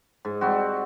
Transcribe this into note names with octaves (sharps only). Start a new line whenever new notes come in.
G#2
G3 C4 F#4